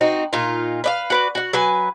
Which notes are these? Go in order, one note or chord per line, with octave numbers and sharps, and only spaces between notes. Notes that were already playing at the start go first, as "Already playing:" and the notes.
C4 D#4 F#4
A#2 D#4 F4
B4 D5 F5
F#4 B4 D5
F#4 F#5
F#3 B4 G#5